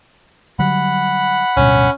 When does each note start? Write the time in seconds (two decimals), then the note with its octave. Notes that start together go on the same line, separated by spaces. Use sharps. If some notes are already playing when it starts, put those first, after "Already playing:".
0.59 D3 F#3 G3 F#5 B5
1.57 D1 G2 B2 C#4